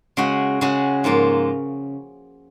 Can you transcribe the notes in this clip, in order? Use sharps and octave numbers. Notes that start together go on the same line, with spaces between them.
C#3 G#3 C#4 F#4
C#3 G#3 C#4 F#4
G#2 F3 A#3 F4